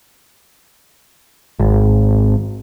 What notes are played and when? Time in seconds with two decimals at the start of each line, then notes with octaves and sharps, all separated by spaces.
1.59 G#1